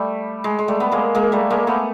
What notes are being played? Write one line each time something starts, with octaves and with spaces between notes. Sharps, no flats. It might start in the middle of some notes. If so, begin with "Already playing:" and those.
Already playing: G3 A3
G#3
G#3
G3 A3
B3
G#3 A#3
G#3 A#3
G3 A3
G#3 A#3
A3 B3